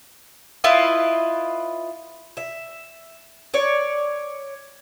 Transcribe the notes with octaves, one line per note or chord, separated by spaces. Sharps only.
E4 F4 B4 D#5
E5
C#5 D5